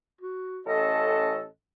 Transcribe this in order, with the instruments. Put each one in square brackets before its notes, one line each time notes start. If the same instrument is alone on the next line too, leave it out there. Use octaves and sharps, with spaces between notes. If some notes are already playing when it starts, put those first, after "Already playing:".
[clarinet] F#4
[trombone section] A1 C#4 A4 [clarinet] D#5